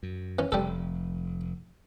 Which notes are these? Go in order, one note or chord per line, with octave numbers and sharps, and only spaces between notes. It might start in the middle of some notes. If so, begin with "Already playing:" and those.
F#2
E3 C#4
F1 G3 A4